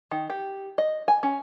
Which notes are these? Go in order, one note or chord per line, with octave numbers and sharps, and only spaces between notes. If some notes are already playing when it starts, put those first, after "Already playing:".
D#3
G4
D#5
G#5
C#4